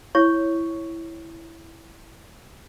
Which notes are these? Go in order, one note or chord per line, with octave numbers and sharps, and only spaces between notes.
E4 C#5 C#6